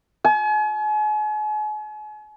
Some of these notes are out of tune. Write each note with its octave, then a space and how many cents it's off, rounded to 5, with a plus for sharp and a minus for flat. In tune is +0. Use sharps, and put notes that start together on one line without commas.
G#5 +40